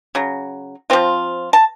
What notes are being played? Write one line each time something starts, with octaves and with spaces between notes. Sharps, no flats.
C#3 F#3
F3 C4 F4
A5